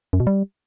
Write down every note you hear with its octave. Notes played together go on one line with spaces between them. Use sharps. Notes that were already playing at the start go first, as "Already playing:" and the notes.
F#2
B2
G3